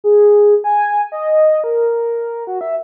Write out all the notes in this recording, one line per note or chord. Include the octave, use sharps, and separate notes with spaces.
G#4
G#5
D#5
A#4
F#4
E5